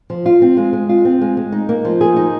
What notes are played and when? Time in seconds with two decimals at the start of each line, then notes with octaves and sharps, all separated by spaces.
0.10 F3
0.26 F4
0.42 C4
0.57 G#3
0.73 G#3
0.89 F4
1.05 C4
1.21 G#3
1.37 G#3
1.52 D#4
1.69 A#3
1.85 F3
2.01 G#4
2.16 D#4